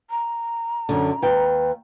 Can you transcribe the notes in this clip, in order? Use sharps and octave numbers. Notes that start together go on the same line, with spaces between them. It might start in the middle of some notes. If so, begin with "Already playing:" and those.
A#5
F#2 D3
D#2 B4 G5